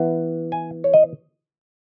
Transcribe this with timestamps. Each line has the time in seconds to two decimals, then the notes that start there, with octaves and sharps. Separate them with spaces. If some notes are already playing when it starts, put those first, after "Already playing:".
Already playing: E3 B3
0.52 G#5
0.84 C#5
0.94 D#5